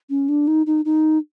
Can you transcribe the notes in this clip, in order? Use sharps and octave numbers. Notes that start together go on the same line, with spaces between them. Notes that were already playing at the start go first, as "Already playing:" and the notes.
C#4
D4
D#4
D#4
D#4